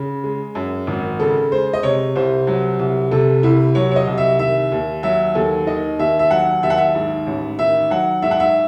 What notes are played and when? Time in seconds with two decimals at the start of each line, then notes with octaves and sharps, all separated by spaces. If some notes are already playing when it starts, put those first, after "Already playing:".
Already playing: C#3
0.24 G#3
0.55 F#2
0.87 G#1
1.20 C#3 A4
1.52 G#3 C5
1.74 D#5
1.83 C3 C#5
2.16 C2 C5
2.47 F#3
2.79 C2
3.11 C3 A4
3.43 C2 E4
3.75 F#3 C#5
3.91 C#5
3.96 D#5
4.07 C2
4.18 E5
4.39 D#3 E5
4.72 D#2
5.03 F#3 E5
5.35 D#2 A4
5.67 D#3 D#5
5.99 D#2 E5
6.19 E5
6.31 F#3 F#5
6.63 D#2 E5
6.70 F#5
6.77 E5
6.95 G#2
7.27 A1
7.59 D#3 E5
7.90 F#3 F#5
8.22 G#2 E5
8.31 F#5
8.40 E5